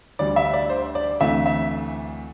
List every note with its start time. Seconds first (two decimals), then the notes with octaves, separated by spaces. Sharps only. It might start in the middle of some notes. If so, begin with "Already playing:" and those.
0.19 D2 D3 G3 D5
0.36 E5
0.54 D5
0.69 C5
0.95 D5
1.20 D2 C3 E3 A3 E5
1.46 E5